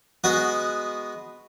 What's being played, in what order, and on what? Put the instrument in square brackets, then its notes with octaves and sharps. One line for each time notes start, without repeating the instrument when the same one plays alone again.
[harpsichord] G#3 B3 F#4